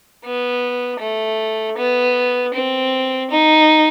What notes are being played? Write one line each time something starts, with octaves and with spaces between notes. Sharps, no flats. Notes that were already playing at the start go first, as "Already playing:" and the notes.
B3
A3
B3
C4
D#4